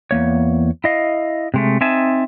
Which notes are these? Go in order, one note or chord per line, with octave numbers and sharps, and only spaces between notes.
E2 A#3 C#5
E4 D#5 F5
C3 G#3 A3
C4 D#4 E5 G#5 A5